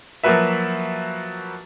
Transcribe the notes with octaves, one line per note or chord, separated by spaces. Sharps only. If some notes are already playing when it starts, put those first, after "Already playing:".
F3 F#3 A#3 F#4 B4 E5